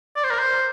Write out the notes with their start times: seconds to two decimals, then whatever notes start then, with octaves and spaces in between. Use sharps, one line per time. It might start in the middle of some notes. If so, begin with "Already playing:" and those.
0.16 D5
0.24 C5
0.31 A#4
0.39 C5